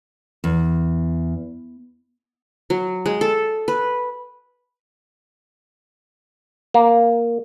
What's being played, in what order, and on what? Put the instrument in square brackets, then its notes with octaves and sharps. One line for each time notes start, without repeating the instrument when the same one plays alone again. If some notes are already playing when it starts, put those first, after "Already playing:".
[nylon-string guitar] E2
[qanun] F#3
G#3
A4
B4
[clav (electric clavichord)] A#3